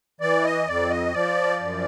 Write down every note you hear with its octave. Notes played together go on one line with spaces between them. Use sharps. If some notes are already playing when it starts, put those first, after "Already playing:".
E3 D5
D#5
F2 D5
D#5
F3 D5
F#2